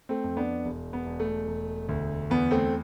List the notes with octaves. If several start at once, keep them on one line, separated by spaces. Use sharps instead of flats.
A3 C4
F2
B3 D4
E1
B3
E1
A3
E1
D2
E2 B3
A3 C4